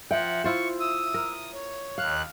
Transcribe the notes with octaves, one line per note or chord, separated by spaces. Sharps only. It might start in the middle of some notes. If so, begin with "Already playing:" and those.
F3 E5 F#5 G5
E4 F4 C5 C#6
D#6 E6
A#4
C#5
D#2 F5 F#6